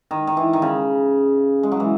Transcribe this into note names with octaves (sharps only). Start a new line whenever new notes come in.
D#3
D#3
E3
D#3
C#3
G#3
F#3
E3